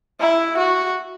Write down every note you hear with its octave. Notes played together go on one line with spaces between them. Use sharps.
E4
F#4